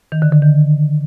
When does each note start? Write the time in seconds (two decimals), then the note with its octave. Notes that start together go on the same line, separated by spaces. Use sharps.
0.12 D#3
0.22 D3
0.32 D3
0.42 D#3